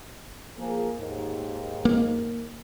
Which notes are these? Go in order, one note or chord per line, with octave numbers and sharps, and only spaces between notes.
F3 A#3 G#4
D#2 G#2
A#3